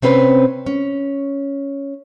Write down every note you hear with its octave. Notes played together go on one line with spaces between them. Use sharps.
C3 C4 C#4 B4 C5
C#4